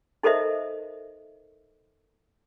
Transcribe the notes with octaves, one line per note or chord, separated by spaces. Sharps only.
D#4 A4 A#4 C5 D#5 E5